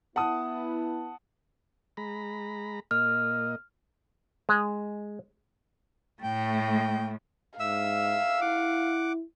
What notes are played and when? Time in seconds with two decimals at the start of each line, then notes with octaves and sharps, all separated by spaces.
0.16 B3 E4 F#5 A5 D#6
1.97 G#3 A#5 B5
2.91 A#2 A#3 D#5 F6
4.49 G#3
6.22 A2 A3 G5
7.60 G#2 E5 F5 E6
8.41 E4 F#5 D6